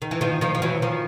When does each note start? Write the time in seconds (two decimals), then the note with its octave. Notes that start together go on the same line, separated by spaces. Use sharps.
0.02 D#3
0.11 E3
0.21 D#3 F3
0.41 D#3 F3
0.55 F3
0.62 E3 F#3
0.82 D#3 F3